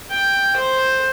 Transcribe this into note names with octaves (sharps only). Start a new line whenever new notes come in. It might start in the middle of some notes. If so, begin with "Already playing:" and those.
G5
C5